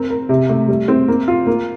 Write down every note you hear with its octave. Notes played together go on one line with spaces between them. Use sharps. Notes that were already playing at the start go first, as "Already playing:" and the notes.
Already playing: C4 A#4
A#4
C3
A3
G3
C4
A#3
F4
A#3